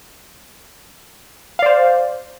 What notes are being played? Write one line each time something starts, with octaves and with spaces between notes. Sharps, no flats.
C5 D5 F5